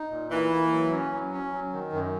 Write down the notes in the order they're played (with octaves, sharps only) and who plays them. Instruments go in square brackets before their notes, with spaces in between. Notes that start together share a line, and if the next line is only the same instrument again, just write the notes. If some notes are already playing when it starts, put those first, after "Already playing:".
Already playing: [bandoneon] D#4
A#2
[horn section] E3 [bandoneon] A#3
[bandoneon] A#3
F#3
C#4
F#3
C#4
F#3
D#3
F#2